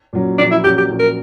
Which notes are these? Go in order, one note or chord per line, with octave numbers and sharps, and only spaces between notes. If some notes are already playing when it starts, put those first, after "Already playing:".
A#2 F#3 C#4
A#1 D4
E4
A#2 F#3 C#4 G4
G4
A#1
A#4